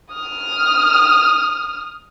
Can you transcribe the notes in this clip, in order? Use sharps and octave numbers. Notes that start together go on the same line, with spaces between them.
D#6 F6